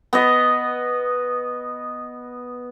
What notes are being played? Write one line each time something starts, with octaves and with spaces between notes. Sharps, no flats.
B3 D#5